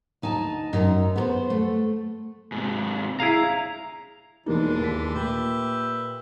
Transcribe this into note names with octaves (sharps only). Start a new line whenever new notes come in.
D2 D#4 G#5 A5
F#2 D#4
B3 A4 C5
A3
G#2 C3
E4 G#4 F5 A#5
E1 E3 G#3 A#3 D4 D#4
D#2 B6
A#2 G4 B4 E5